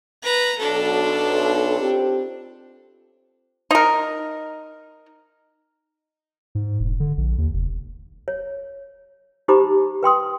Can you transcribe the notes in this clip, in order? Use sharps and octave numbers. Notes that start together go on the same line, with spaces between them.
B4 A#5
B1 D4 A4
C4 F4 G4
D#4 A#4
G#2
E1
D3
A#1
D#2
F1
C#5
D#4 G4 C5 A#5 B5 D6
B4 G5 C6 D#6